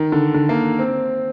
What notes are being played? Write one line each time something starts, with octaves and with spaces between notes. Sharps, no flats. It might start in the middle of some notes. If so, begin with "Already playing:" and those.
Already playing: D#3
D3
D3
A#3
C4